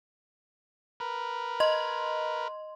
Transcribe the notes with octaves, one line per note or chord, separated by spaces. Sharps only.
A#4 B4
D#5 C6